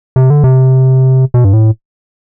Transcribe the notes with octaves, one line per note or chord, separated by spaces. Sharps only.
C3
D3
C3
B2
G2
A2